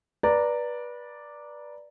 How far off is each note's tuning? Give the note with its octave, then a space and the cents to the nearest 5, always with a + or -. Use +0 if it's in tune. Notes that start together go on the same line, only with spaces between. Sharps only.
B4 -25 D5 +0 A#5 -10